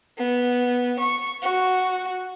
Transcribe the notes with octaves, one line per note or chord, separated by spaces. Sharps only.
B3
C#6
F#4